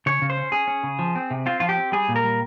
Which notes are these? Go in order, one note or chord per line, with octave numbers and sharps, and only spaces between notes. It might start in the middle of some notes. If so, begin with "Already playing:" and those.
C#3 C#5
C#3
C5
C#4
C#4 G#4
C#4
C#3
F3
C4
C3
C4 F4
F3 F4
G4
C4
G3 G#4
A#2
A#4
G3